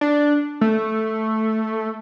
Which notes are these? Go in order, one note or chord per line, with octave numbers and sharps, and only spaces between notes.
D4
A3